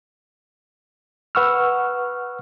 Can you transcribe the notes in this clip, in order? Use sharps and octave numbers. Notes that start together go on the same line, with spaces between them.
B4 F#5 C#6 E6 F6